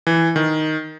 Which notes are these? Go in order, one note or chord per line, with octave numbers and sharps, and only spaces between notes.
E3
D#3